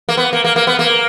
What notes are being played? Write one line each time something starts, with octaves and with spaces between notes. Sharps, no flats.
A#3
B3
A#3
A#3
A#3
B3
A#3